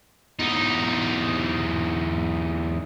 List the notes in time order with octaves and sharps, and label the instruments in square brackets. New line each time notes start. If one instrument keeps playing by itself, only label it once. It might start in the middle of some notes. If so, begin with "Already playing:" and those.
[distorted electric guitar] E2 D#4